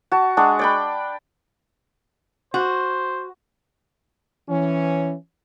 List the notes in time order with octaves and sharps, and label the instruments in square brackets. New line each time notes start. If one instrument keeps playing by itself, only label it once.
[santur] F#4 A5
G#3 D4 F#4
D5 G5 B5
[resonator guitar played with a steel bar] F#4 [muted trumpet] C5
[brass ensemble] E3 C#4